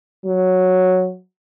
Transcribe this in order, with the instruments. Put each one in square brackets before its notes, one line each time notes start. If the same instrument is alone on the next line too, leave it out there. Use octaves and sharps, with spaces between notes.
[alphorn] F#3